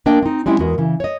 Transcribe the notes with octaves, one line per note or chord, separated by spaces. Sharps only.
A#3 D4 A#4 D#5 G5
C4 D#4
G3 G#3 C4 C#4 E4
E2 G#3 F#4 A#4
C#3 E3
C#5 D#5